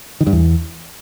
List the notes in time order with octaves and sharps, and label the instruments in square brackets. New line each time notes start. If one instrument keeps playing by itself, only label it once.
[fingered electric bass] D#3
G2
E2